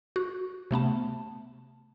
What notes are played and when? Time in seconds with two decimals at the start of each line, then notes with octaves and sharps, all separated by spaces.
0.16 F#4
0.71 C3 A3 B3 A5